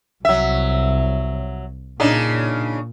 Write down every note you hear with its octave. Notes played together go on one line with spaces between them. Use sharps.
C2 F#3 E5
A#2 C#3 D4 D#4